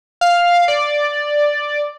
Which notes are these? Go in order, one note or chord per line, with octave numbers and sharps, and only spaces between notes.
F5
D5